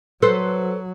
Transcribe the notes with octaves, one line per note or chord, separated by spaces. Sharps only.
F#3 A4 B4 C5